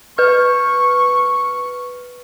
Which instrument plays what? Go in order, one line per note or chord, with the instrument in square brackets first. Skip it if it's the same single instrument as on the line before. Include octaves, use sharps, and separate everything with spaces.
[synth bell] B4 F6 [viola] C#6